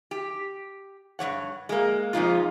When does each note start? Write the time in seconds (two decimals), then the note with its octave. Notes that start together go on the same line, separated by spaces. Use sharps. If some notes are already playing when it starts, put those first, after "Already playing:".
0.11 G4
1.19 G2 F3 C#5 F#5
1.69 G#3 A#3
2.13 F2 C3 F3 G#3 D#4 F4